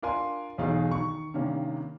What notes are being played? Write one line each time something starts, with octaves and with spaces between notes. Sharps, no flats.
D4 F4 A#4 F5 G#5 C6
B1 E2 B2 D#4 G#4 F5
D#3 C#6
G2 C3 D#3 A#3 C#4